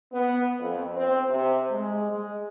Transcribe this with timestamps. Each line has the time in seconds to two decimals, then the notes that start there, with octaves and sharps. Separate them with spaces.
0.13 B3
0.59 F2
0.96 C4
1.29 C3
1.70 G#3
2.11 G#3